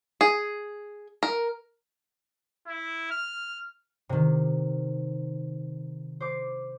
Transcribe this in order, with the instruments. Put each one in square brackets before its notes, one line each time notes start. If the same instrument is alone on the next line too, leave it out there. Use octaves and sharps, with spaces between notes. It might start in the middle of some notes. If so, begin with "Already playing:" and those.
[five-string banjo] G#4
A#4
[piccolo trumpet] E4
F6
[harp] C3 D#3
C5 D6